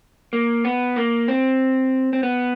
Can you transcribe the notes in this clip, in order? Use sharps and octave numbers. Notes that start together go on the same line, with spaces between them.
A#3
B3
A#3
C4
C4
B3